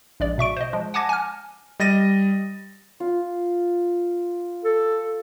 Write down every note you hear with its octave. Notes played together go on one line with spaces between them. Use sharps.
A#1 G#3 D5
B2 E5 C#6 D7
C5 D#5
F3 G#3
F#5 G#5 A5 D6 G#6 A#6
G#5 F6
G3 D#5 A6 A#6 D#7
F4
A4